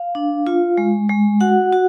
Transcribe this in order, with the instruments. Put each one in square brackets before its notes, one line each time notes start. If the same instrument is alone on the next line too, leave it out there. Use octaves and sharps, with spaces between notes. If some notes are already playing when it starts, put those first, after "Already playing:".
Already playing: [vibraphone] F5
D4
F4
G#3
G#3
F#4 F#5
F#4